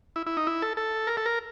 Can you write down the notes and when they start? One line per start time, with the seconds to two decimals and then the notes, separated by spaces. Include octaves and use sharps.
0.16 E4
0.26 E4
0.37 D#4
0.47 E4
0.62 A4
0.77 A4
1.07 A#4
1.17 A4
1.26 A#4